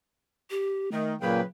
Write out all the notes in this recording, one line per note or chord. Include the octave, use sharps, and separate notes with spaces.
G4
D#3 A3
A#2 C#3 F#3 A#3 G#4 B4 G5